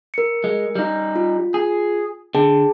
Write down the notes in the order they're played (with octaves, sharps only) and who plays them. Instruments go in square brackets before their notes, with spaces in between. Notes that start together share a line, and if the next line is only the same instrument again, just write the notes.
[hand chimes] A#4 C#7
[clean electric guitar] G#3
G3 D#4
[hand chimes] F4
[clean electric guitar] G#4
[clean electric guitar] D3 [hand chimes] G#4 G5 A5